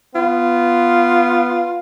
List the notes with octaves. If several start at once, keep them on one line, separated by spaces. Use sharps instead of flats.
B3 F4